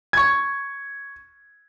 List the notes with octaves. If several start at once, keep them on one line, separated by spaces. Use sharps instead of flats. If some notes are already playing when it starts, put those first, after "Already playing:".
C#6 G#6